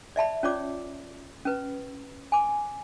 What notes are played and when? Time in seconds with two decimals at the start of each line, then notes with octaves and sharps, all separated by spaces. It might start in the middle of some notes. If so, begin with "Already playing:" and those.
0.16 D5 E5 A5 B5
0.43 C#4 F4 C#5 D5 D6
1.45 C#4 B4
2.32 G#5 D6